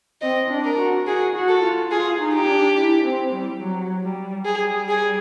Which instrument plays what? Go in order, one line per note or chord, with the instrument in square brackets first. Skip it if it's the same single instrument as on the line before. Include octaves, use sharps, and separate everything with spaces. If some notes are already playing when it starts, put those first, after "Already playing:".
[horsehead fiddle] C4 [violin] D#5
[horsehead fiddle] D4
[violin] A#4
[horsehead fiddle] F#4
[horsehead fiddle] F#4 [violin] G#4
[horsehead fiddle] F#4
[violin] A4
[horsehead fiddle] F4
[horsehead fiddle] F4 [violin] G#4
[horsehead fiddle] D#4
[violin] G4
[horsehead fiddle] D4
E4
C4
G3
F#3
G3
[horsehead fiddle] G3 [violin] G#4
[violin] G#4